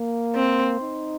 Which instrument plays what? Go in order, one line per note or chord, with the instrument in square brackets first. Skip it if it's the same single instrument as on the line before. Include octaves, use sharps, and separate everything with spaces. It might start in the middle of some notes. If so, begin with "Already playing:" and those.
Already playing: [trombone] A#3
[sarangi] C4
[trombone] D#4